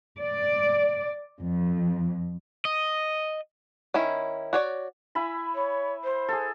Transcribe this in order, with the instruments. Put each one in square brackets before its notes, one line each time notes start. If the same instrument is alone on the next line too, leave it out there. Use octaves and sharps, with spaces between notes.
[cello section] D5
F2
[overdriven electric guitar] D#5
[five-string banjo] D#3 C#4 E4
F#4 C#5 D5
[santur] E4 G#5 B5
[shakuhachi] C#5
C5
[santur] G#4 A4